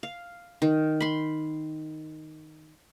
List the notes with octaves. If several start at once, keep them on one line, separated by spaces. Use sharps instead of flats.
F5
D#3
B5 C6